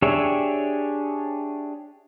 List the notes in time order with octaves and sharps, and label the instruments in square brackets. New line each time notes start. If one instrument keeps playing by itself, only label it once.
[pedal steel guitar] D4 G4 G#4 C#5 E5